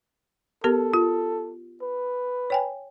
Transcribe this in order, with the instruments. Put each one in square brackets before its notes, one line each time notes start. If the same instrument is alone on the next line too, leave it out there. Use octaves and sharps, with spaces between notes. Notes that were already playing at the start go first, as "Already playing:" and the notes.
[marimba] B3 G4 A#4 [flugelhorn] A4
[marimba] F4
[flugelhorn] B4
[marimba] C#5 G5 G#5